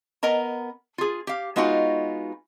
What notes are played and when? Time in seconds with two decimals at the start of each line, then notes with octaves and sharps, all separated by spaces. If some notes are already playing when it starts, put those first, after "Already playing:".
0.23 B3 A#4 D#5 A#5
0.98 F4 G#4
1.27 G4 F5
1.56 G#3 B3 D#4 F4 F#4